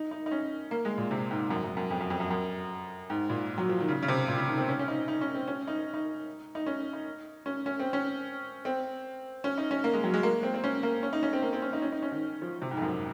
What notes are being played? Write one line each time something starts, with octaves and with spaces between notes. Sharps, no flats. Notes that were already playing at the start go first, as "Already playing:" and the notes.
Already playing: D#4
D#4
D#4
C#4
A#3
G#3
A#2
C3
G#2
F#2
F#2
F#2
F2
F#2
F2
F#2
F#2
G#2
A#2
F#3
F3
D#3
C#3
C#3
C3
A#2
C#3
D#3
C4
C#4
C#4
D#4
D#4
C#4
C4
C#4
D#4
D#4
D#4
C#4
D#4
C#4
C#4
C4
C#4
C4
C#4
D#4
C#4
A#3
G#3
F#3
G#3
A#3
C4
C4
C#4
A#3
C#4
D#4
C#4
C4
A#3
C4
C#4
D#4
C#4
D#4
C#4
D#3
F3
C3
G#2
F2
F#2